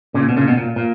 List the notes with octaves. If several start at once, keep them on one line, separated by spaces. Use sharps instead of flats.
A#2 C#3
B2
A#2 C#3
B2
A#2
A#2